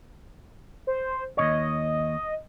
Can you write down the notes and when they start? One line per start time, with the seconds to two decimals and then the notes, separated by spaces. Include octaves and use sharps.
0.87 C5
1.37 D#2 C3 C#5 D#5